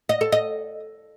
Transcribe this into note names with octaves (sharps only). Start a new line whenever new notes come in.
D#5
A4
D#5